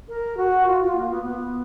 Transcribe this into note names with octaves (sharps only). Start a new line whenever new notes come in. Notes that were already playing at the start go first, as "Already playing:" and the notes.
A#4
F#4
F4
F4
A#3
B3
B3